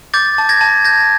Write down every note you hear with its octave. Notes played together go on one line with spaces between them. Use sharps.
D6 G6 A6
A5
G#6 A#6
A5
G6 G#6 A#6